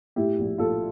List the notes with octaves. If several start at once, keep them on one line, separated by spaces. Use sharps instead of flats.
A2 E4 G4
A#1
A#1 F4 A4